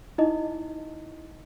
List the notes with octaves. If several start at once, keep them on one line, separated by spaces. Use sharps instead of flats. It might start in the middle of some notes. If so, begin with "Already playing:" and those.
D#4 E4 D#5